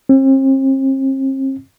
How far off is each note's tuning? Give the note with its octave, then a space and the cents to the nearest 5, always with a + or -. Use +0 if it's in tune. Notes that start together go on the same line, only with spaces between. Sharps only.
C4 +40